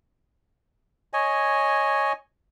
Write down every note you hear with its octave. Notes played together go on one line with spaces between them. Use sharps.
C#5 D#5 G#5